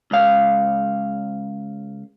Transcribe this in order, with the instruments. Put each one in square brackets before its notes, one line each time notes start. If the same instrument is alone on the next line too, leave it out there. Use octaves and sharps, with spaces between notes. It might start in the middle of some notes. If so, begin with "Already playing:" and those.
[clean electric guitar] C#2 F5